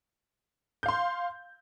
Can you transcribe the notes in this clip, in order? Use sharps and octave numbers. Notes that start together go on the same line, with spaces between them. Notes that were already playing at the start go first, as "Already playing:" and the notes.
F5 C6 G6